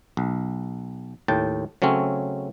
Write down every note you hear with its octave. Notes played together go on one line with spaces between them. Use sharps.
B1
D#2 A2 G5 A5
C#3 F#3 A3 C4 C#4